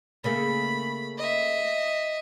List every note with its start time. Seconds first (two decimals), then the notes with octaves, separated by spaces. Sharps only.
0.24 C#3 A3 A#3 B5
1.18 D#5 E5